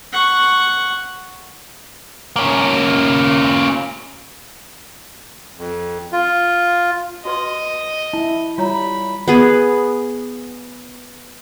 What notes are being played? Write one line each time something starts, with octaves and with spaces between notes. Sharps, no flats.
F#5 C#6
A#3 C#4
F2
F4
F#4 B4 D#5 C6
E4 A5
G3 F4 C#5 A#5 B5
B3 G#4